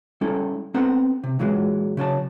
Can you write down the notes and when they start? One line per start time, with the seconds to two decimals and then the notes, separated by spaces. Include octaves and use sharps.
0.21 G3 C#4 E4 A4
0.74 B3 C4 A4 C5 F#5 A#5
1.24 C3
1.39 A#2 E3 F#3 G#3
1.97 C#3 F#3 C5 A5